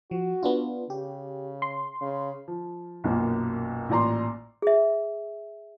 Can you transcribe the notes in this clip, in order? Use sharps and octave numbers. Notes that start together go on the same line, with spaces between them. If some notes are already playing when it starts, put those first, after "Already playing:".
F3 F#4
B3 D4 F4
C#3 G4
C6
C#3
F3
B1 F#2 A#2 A#3
A1 A#2 D5 A#5 C6
G#4 E5